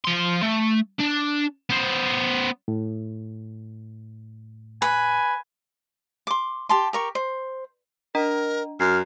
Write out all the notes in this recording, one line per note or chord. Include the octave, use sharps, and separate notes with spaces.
F3 C6
A3
D4
B3 C5
A2
B4 G#5
C6 D6
G4 A5 C6
G4 A#4 C#6
C5
D4 A#4 D#5 A#5
F#2 F6 C7